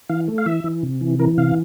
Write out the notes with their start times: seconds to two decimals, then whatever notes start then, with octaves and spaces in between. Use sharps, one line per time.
0.09 E3 F5
0.28 A3
0.38 F5
0.46 E3 E5
0.64 E3
0.83 C3
1.01 E3
1.19 E3 A#4
1.38 C3 F5